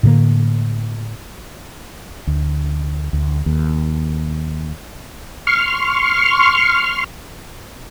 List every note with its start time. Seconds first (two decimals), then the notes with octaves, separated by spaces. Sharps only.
0.03 A2 D3 A#3
2.27 D2
3.13 D2
3.46 D#2
5.47 C6 C#6 F6